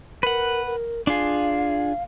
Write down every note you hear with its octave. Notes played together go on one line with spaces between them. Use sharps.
A#4 B4 F#5
A#4
D4 F4 G#4 F5